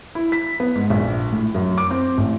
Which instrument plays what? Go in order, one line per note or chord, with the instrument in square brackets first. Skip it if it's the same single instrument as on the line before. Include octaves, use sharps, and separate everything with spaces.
[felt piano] E4
B6
B3
G#2
A#1
A2
F#2
D6
C4
A1